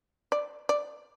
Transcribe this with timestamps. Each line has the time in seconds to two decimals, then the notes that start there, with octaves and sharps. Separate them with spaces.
0.32 D5
0.69 D5